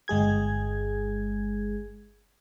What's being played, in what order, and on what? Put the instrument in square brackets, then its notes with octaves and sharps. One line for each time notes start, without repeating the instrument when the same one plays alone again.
[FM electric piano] G1 G#3 G#4 G#6